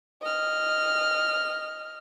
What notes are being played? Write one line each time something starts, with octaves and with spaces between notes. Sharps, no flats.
D#5 F6